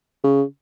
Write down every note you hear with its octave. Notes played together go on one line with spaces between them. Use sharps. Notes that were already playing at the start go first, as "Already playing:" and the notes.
C#3